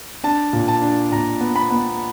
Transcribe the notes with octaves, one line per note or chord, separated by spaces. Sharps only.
D4 A5
A#2
A5
D4
A#2 A#5
B3
B5
B3